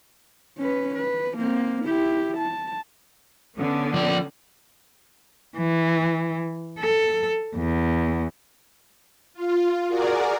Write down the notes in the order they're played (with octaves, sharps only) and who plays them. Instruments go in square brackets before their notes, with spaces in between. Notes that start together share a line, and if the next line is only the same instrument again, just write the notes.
[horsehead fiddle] C#4 B4
B4
A#3 C4
E4 G4
A5
[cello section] D3 B3 C#4
[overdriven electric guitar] F3 D5
[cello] E3
A4
E2
[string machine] F4
F#4 G#4 A#4 D5